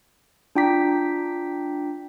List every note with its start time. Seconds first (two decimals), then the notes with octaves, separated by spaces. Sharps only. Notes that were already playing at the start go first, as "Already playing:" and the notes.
0.55 D4 F4 G5 A#5 D6 B6